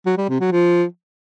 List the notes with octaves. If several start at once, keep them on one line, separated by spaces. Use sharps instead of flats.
F#3
G3
C3
F#3
F3